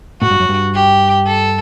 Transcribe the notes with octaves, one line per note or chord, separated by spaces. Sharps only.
A2 F#4
G2
F#2
G2
G4
A4